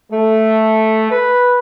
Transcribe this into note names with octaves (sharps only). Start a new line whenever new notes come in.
A3
B4